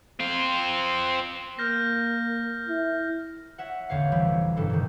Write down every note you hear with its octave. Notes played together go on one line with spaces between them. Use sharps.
C4 F4
A#3 F6 G6 A#6
E4
C#5 E5 F#5
A1 E2 D3 C#5 F5 C#7
F1 E3 G3 E6 D7
E1 G2 C#3 A4
A#2 D#3